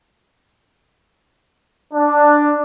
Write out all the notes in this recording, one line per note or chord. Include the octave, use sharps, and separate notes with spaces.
D4